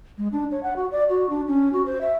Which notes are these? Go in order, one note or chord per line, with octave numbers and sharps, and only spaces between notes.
G#3
D4
C#5
F#5
F#4
D5
F#4
D4
C#4
F#4
C5
E5